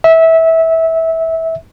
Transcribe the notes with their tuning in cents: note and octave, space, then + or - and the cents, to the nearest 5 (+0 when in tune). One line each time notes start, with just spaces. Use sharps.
E5 -20